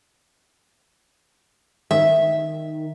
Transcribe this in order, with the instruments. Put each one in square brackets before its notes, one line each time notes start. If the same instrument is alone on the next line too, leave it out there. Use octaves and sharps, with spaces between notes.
[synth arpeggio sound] D#3 [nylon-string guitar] E5